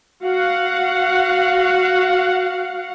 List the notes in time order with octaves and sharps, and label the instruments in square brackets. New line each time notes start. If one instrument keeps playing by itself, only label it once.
[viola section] F#4 F5 F#5